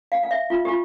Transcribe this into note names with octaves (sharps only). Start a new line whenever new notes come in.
F5
F5
E5
F4
G4
F4